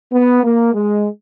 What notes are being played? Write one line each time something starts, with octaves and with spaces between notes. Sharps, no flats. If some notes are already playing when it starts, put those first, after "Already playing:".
B3
A#3
G#3